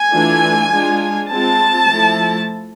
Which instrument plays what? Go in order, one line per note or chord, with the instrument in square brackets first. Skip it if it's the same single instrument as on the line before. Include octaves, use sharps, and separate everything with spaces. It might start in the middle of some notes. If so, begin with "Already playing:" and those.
Already playing: [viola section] G#5
E3 A3 D4 F4
G#3 D4 F4
G#3 C4 F4 A5
F3 A3 E4